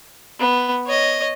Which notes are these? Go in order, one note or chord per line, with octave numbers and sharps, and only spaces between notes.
B3
C#5 D#5